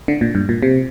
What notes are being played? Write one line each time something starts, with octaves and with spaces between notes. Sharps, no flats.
D3
A#2
G2
A#2
C3